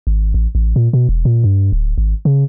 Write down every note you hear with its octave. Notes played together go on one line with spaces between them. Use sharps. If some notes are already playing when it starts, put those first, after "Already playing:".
G#1
A1
A1
A#2
B2
E1
A#2
G2
D1
G#1
C#3